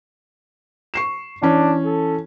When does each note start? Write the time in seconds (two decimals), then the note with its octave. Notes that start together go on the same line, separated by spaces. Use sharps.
0.94 C#6 C7 E7
1.42 E3 C#4 D4
1.85 A4